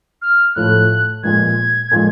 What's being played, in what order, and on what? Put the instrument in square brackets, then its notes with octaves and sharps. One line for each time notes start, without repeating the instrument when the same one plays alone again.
[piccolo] F6
[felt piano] A2 F3 A3 [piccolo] F#6
[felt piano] A#2 F3 G#3 [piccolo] G#6
[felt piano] A#2 F3 G#3